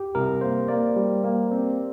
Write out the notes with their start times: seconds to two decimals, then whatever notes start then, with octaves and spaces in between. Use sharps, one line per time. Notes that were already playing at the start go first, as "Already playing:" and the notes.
Already playing: G4
0.15 C2 A#4
0.41 A#3 C5
0.68 A#3 D5
0.96 G3
1.24 A#3
1.51 C4